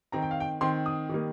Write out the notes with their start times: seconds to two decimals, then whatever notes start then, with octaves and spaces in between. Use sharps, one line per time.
0.12 D#3 C4 A#5
0.22 G5
0.31 F5
0.40 G5
0.61 D#3 C4 C6
0.86 D#6
1.09 D#3 G3 A#3